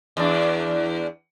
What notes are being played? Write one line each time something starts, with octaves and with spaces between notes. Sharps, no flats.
E2 D4